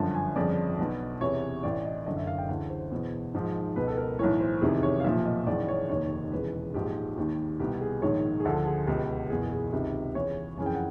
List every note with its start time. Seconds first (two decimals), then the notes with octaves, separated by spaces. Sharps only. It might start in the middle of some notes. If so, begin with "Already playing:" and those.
Already playing: G1 F#2 D3 F3 A5
0.15 G#5
0.36 G1 F2 C#3 F3 D5
0.78 B1 B2
1.21 E2 C3 E3 C#5
1.63 A1 A2 E3 D5
1.85 D#5
2.06 F#1 F#2 D3 D#5
2.17 E5
2.27 F5
2.38 G5
2.49 D2 C#3 E3
2.70 C5
2.92 E2 B2
3.34 G#1 G#2 F3
3.76 C#2 B2 B4
3.87 A4
3.98 A#4
4.19 B1 A2 E3 C#5
4.40 C5
4.61 F1 E2 C3 D#3 G#4
4.83 C#5
5.00 F5
5.04 B1 A#2 F3 E5
5.25 D#5
5.46 G#1 F#2 C#3 E3 D5
5.68 C#5
5.89 F1 D#2 D#3 C#5
6.32 E1 E2 C#3 B4
6.74 A#1 G#2 F3 G4
7.17 D#2 D#3
7.60 C2 B2 G4
7.81 G#4
8.02 A#1 G#2 D#3 C#5
8.40 G#4
8.45 D2 D3 F3 A4
8.66 G#4
8.87 C#2 B2 G4
9.30 F#1 E2 B2 G#4
9.51 G#4
9.73 C#2 C3 D#3
10.15 E2 C#3 E3 C#5
10.58 F#1 F2 C#3 E3 G#5
10.66 G5
10.75 F#5